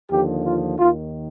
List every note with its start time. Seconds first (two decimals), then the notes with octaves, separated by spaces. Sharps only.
0.10 D#2 D3 F3 G4
0.45 F4
0.78 D#2 D#3 F4